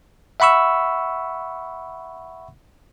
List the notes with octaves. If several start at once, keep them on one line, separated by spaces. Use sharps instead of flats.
E5 F#5 B5 C#6 E6